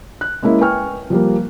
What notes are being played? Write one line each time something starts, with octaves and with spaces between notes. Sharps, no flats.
F#6
G#3 A#3 C#4 E4
B4 G5 G#5 C#6 F6
F3 G3 A#3